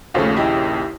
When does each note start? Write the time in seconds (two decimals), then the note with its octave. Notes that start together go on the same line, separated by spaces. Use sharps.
0.14 A#1 D#2 C#3 A3 C#4 F4
0.36 E4 G4 D#5